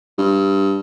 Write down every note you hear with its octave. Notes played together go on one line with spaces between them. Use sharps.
G2